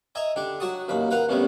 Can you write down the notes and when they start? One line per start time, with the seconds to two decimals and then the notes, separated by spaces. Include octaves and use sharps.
0.15 D#5 E5 G#5 A#5
0.36 D3 D4 G4
0.60 F#3 F#4 A5 D#6
0.88 A1 D#2 F#3 B5
1.11 A#4 B4 F5 F#5 B5
1.28 E2 A2 C3 G3 B3 C#4